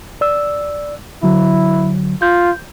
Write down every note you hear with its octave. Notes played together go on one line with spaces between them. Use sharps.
D5 E6
D3 F#3 E4
F4 G6